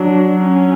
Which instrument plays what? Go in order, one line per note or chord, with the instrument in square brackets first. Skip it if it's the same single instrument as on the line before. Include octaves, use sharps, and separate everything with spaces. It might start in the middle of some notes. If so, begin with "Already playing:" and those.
Already playing: [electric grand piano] F#3 [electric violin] D4
[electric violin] C#4